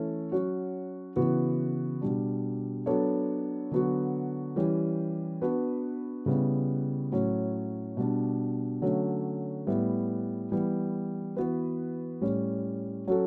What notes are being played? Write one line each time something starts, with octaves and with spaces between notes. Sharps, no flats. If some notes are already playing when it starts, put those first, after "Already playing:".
Already playing: E3 A3 C#4 E4 A4
F#3 C#4 F#4
C#3 E3 B3 F#4
B2 G3 D4
F#3 B3 D4 A4 C#5
D3 F#3 B3 F#4
E3 G3 C#4 G4
B3 D4 F#4 B4
C#3 G3 B3 E4
A2 F#3 C#4
B2 G3 D4
D3 F#3 A3 C#4
A2 G3 B3 E4
E3 G3 B3
E3 B3 F#4 B4
A2 G3 C#4
F#3 C#4 F#4 A4